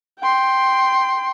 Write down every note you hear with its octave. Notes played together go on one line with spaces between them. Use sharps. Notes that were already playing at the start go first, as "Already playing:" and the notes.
G5 C6